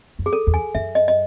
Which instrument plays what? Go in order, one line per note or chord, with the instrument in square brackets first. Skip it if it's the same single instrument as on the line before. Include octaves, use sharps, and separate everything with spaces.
[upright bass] F#2
[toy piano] G#4
A4
[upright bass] E2
[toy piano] G#5
[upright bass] F#2 [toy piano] E5
[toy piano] D#5
D#5